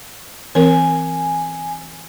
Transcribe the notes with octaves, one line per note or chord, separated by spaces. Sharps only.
E3 C4 A#4 G#5